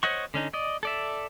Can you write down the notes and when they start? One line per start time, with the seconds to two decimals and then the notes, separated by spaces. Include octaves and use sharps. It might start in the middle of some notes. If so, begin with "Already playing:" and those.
0.03 C5 C#5 D#5 F#5 C#6
0.34 D3 C#4 D#4
0.53 D5 D#5
0.83 A4 D5 E5